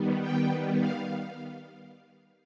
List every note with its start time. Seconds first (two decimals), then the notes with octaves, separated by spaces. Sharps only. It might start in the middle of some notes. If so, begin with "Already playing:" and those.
Already playing: D#3 G3 B3
0.20 G5
0.80 F5